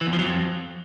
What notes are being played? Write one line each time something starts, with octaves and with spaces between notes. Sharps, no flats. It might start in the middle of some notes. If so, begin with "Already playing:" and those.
E3
E2
F3
F#3
F2